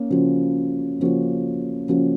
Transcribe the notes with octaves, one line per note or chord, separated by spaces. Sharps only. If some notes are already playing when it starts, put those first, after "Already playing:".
Already playing: A#3 C#4
C#3 F3 A#3 C#4 F#4
C#3 F3 A#3 C#4 F#4
C#3 F3 A#3 C#4 F#4